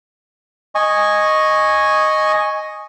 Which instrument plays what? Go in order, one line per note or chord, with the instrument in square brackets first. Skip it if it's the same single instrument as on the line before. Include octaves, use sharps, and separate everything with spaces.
[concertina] D#5 G#5 C#6